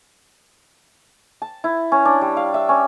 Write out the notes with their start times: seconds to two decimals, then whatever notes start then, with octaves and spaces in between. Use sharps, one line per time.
1.42 A5
1.64 E4
1.92 C#4
2.05 D4
2.21 G3
2.37 F5
2.54 E5
2.69 C#4